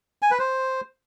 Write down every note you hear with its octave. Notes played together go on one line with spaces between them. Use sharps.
G#5
B4
C5